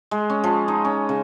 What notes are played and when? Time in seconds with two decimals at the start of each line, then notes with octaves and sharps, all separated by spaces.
0.11 G#3
0.30 C#4
0.44 F3
0.68 D#4
0.85 C#4
1.09 C#3